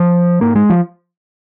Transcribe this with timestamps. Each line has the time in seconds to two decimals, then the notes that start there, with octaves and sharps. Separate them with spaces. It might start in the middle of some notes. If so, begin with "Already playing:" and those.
Already playing: F3
0.41 G#2 A#3
0.55 G#3
0.70 F3